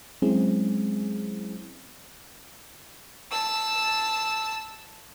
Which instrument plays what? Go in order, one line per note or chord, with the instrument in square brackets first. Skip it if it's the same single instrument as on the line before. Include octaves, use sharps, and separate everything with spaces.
[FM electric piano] F#3 G#3 C4 C#4 E4 G#4
[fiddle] A5 E6